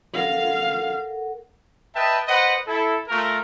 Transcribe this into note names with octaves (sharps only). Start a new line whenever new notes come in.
A4 A#4 F5 F#5
B4 D#5 E5 G5 A5
B4 C5 D#5 F#5
E4 A4
A3 F4 A#4